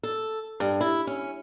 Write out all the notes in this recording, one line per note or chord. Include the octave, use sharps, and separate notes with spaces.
A4
G2
E4
C#4